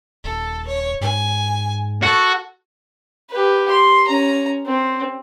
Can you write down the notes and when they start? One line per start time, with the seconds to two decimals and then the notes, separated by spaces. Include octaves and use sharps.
0.24 D#1 A4
0.67 C#5
1.01 G#2 G#5
2.02 F#4 A4
3.30 G4 B4
3.71 C6
4.07 C#4 A#5
4.66 C4